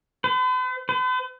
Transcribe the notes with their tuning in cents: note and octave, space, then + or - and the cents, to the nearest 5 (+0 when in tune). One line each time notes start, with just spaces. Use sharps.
B4 +45
B4 +45